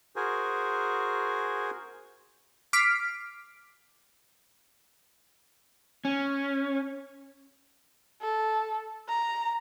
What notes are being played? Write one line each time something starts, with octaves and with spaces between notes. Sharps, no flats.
F#4 G#4 A#4 C5 G#5
D6 F6 B6 C7 D7
C#4
A4
A#5